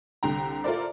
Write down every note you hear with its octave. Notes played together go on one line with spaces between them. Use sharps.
C2 D3 G5 A#5
E4 F4 A4 A#4 C5 D5